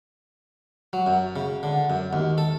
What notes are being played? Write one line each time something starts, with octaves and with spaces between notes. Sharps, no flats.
F#3
F#2
C#3
D3
F#2
D#2
A4